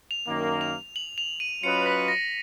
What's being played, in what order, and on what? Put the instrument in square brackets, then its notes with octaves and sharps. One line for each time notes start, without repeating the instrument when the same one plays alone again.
[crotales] F7
[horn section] F#2 D#3 A#3
[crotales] F7
F#7
F7
D#7
[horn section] F#3 C#4 F4 B4 D#5 [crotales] C#7
[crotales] B6
A#6